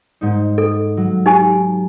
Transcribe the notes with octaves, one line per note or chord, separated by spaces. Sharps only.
G#2 D#4
A4
F#3
D#4 G4 G#5